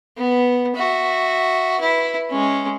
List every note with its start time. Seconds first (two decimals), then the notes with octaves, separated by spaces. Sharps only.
0.17 B3
0.76 F#4 E5
1.79 E4 B4
2.30 G#3 C#4